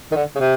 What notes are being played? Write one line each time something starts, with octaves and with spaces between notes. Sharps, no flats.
D#3
D3
C#3
C3